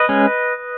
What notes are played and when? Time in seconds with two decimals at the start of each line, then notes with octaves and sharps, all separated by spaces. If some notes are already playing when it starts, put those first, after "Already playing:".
Already playing: B4 D#5
0.09 G#3 C#4